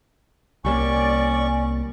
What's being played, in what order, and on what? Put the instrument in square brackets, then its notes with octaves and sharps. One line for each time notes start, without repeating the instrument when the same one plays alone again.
[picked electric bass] C2 G3 A#3 [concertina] C#4 C#6 [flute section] D5